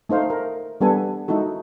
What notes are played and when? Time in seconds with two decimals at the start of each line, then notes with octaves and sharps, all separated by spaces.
0.09 A3 D#4 C5 F5
0.30 A#4
0.81 G3 B3 D4 A4 B4 G#5
1.28 G#3 D#4 E4 F#4 A4